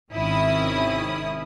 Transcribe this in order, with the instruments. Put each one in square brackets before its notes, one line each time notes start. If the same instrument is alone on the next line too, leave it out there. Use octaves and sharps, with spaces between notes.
[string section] G#1 C3 D#3 C#4 E4 D#6